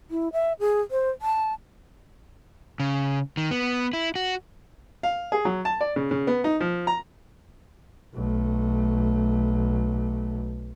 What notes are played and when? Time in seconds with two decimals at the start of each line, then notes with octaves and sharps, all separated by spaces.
0.11 E4
0.33 E5
0.60 G#4
0.91 C5
1.22 A5
2.80 C#3
3.37 D#3
3.51 B3
3.93 E4
4.16 F#4
5.03 F5
5.32 G#4
5.45 F#3
5.65 A5
5.81 D5
5.96 C#3
6.11 C#3
6.27 B3
6.44 D#4
6.61 F3
6.87 A#5
8.14 B1 A3